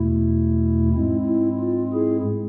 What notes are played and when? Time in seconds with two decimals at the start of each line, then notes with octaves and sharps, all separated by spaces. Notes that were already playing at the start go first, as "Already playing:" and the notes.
Already playing: E2 B2 A3 E4
0.93 G#2 G#3 C4 E4
1.26 E4
1.60 F4
1.93 E4 G#4